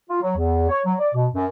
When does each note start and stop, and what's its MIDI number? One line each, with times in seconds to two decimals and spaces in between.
0.10 0.18 65
0.22 0.36 54
0.36 0.68 40
0.69 0.79 73
0.86 0.95 54
0.99 1.09 74
1.14 1.26 47
1.35 1.46 42